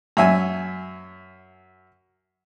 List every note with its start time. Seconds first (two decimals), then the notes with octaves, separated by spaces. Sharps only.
0.17 F#2 E5 G#5